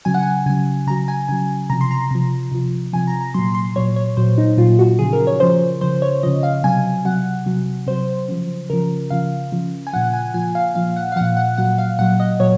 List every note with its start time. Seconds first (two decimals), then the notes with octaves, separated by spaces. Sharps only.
0.05 C#3 F#3 G#5
0.14 F#5
0.23 G#5
0.46 C#3 F#3 G#5
0.87 C#3 F#3 A#5
1.08 G#5
1.28 C#3 F#3 G#5
1.70 C3 F3 A#5
1.81 C6
1.91 A#5
2.11 C3 F3
2.52 C3 F3
2.93 C3 F3 G#5
3.07 A#5
3.21 A#5
3.34 A#2 F#3 C6
3.55 C6
3.76 A#2 F#3 C#5
3.96 C#5
4.17 A#2 F#3 C5
4.38 D#4
4.58 A#2 F#3 F4
4.79 F#4
4.99 C#3 F3 G#4
5.13 A#4
5.27 C#5
5.40 C#3 F3 C5
5.81 C#3 F3 C5
6.02 C#5
6.23 C#3 F3 D#5
6.43 F5
6.63 C3 F#3 G#5
7.05 C3 F#3 F#5
7.46 C3 F#3
7.87 C3 F#3 C5
8.28 C#3 F3
8.70 C#3 F3 A#4
9.10 C#3 F3 F5
9.52 C#3 F3
9.87 G#5
9.93 A#2 F3 F#5
10.04 F#5
10.13 G#5
10.34 A#2 F3 G#5
10.55 F5
10.75 A#2 F3 F5
10.96 F#5
11.12 F5
11.16 F3 F#5
11.21 A#2
11.37 F#5
11.57 A#2 F#3 F#5
11.78 F5
11.99 A#2 F#3 F#5
12.20 D#5
12.40 A#2 F#3 C#5